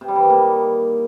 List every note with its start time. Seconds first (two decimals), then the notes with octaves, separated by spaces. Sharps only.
0.01 C3
0.08 G3
0.15 E3
0.23 D#3
0.30 A#3